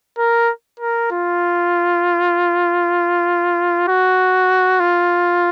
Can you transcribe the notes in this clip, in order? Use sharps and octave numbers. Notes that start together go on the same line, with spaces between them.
A#4
A#4
F4
F#4
F4